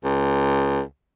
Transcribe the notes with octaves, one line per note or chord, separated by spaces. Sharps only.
C#2